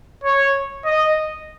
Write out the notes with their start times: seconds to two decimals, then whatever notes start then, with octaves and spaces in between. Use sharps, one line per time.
0.24 C#5
0.85 D#5